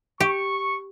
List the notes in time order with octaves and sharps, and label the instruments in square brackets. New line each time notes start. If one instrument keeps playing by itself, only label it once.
[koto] G4 [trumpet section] C#6